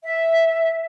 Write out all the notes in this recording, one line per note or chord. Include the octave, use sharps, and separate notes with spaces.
E5